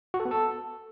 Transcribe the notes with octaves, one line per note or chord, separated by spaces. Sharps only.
F#4
A4
B3
A4